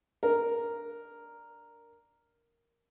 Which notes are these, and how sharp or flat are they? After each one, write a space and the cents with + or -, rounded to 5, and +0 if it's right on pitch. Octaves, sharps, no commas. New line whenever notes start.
D4 +0 A#4 +0